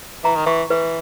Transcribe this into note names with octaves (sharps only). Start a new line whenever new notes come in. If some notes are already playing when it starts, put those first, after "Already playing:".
E3 A#5
D#3
E3 C#6
E3 B4